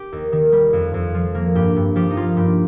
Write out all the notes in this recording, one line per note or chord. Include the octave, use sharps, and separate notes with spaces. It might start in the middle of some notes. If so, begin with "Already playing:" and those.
Already playing: G4
D#2
D#3
G3
F2
F2
F3
A#3
G2 G4
G2
F3 G4
D#4
A#3 F4
G2 G4